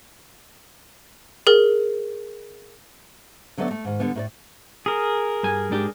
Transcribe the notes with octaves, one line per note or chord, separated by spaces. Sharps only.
G#4 A#4
D3 F#3 A3 B3 A4 D5
A3
G#2 D#3
D3 G3 B3
A2 A#4 D5
G#4 A#4
G2 G#5
G#2 D4 G4